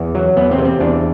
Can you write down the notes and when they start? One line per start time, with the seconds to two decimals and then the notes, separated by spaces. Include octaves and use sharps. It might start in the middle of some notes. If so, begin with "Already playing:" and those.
Already playing: E2 B3
0.15 F#3
0.37 E2 B3
0.51 C4
0.58 C3
0.65 C4
0.80 E2 D4